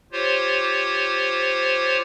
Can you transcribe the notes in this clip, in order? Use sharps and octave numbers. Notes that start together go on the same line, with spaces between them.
F4 G4 C5 C#5